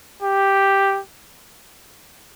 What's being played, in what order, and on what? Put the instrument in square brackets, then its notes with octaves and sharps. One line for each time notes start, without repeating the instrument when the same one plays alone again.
[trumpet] G4